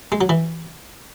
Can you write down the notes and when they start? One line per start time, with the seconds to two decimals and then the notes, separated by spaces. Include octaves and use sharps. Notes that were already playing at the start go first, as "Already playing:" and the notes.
0.12 G#3
0.21 F#3
0.29 E3